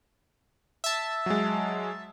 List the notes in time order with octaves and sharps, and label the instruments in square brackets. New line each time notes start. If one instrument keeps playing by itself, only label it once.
[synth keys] E5 A5
[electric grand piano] F#3 G#3